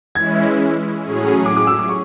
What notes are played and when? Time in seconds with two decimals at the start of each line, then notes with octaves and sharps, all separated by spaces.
0.15 E3 G#3 C#4 E4 G#6
1.02 A2 F#3 C#4 G#4
1.46 D6
1.56 D6
1.67 E6
1.79 D6
1.89 C#6